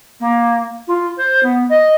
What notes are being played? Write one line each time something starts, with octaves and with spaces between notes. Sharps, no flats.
A#3
F4
C5
B3
D#5